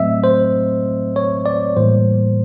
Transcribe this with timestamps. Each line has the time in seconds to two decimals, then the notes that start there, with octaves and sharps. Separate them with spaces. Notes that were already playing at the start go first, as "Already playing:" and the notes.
Already playing: A2 F#3 A3 C4 D#5 E5
0.24 C5
1.16 C#5
1.46 D5
1.77 A2 E3 G3 A#3 C5